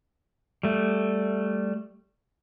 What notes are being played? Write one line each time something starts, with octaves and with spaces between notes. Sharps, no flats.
G3 A3